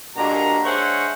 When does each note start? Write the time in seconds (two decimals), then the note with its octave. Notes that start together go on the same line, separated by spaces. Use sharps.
0.16 G2 A#2 G#3 A#3 F#4 A#5
0.64 G#3 D4 C5 C#5 E5 F#5